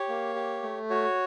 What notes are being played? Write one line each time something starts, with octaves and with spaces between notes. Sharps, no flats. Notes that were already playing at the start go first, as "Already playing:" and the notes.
Already playing: G4 C#5
A#3
G4
A3
F#4 C#5